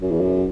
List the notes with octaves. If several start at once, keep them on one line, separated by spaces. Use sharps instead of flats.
F#2
E2
F#2